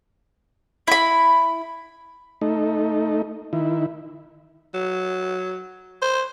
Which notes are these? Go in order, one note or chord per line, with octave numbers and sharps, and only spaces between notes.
E4 B5
A3 D#4
D#3 E4
F#3
C5